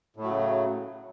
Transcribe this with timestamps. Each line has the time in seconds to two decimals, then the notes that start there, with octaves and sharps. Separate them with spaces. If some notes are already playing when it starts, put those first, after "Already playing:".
0.16 A2
0.20 A3
0.24 F#3
0.27 C#3